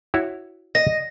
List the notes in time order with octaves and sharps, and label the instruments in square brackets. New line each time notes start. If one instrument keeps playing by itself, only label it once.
[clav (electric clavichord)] E4 F#4 C#5
[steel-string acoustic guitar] D#5 [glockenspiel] A#6